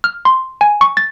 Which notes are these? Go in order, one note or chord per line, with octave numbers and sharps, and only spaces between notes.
F6
C6
G#5
C#6
A6